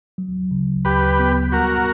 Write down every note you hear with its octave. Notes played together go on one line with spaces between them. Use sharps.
F#3
C#3
D2 G4 B4
B3
G3 F#4 A#4